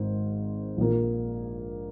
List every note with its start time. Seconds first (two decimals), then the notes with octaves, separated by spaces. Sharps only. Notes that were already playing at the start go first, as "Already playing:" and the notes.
Already playing: G#1 G#2 D#3 C5
0.77 A#1 A#2 F3 A#3